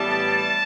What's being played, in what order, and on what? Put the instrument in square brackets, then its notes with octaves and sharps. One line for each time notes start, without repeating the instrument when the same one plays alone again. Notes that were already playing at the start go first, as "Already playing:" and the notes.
Already playing: [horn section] A2 E3 G3 B3 A5